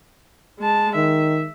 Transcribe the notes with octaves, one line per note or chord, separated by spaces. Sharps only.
G#3 A5
D#3 E5